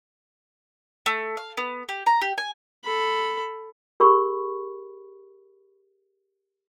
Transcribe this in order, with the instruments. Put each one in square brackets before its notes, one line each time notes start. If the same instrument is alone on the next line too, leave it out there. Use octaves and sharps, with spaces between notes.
[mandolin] A3
F5
B3
G4
A#5
G4
G#5
[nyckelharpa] A4 B5
[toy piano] G4 G#4 A#4 B5 C#6